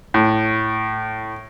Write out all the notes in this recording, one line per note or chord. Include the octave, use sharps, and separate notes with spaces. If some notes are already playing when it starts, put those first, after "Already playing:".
A2